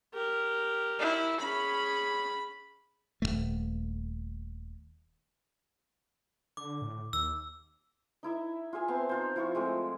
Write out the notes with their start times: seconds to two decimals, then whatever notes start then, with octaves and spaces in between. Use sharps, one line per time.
0.14 G4 A#4
0.99 E4
1.40 C#4 G#4 B5
3.22 D#1 E2 A3
6.57 D3 D6
6.82 A2
7.13 D#2 E6
8.23 D#4 E4 E5
8.73 F4 G#4 E5 G#5
8.88 B3 C4 A5 C6
9.09 D#4 F4 C5
9.36 F3 E4 F4 C#6
9.55 G#3 A3 C4